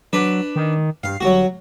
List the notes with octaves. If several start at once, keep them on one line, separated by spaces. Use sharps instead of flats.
F#3 D4 B4
D#3
G2 F5
G1 F#3 F#4